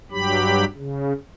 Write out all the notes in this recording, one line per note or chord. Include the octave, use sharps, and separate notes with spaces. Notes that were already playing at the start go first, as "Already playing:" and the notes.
G2 F#3 G4 B5
C#3